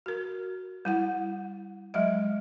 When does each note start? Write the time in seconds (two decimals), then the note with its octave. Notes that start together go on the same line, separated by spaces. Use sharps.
0.06 F#4 A#4
0.85 G3 E4 F#5
1.94 F#3 G#3 D#5 E5